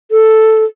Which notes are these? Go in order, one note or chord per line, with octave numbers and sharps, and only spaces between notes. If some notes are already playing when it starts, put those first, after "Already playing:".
A4